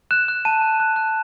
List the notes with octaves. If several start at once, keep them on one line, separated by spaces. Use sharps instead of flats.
F#6 E7
F#6
A5 D#7
A5
F#6
F#6